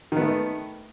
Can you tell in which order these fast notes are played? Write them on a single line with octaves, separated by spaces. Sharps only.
D#3 B3 A3